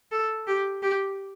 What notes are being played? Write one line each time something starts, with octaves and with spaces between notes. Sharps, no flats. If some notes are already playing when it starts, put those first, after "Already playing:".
A4
G4
G4